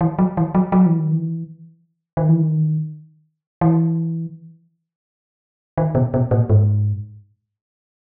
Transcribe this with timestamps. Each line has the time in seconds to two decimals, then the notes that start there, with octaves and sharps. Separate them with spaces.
0.01 E3
0.19 F#3
0.37 E3
0.55 F#3
0.72 F#3
0.86 E3
0.99 D#3
1.12 E3
2.17 D#3
2.29 E3
2.42 D#3
3.61 E3
5.78 D#3
5.95 B2
6.14 B2
6.31 A#2
6.50 G#2